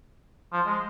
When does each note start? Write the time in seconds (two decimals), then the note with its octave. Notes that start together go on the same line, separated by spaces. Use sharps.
0.53 F3
0.66 G#3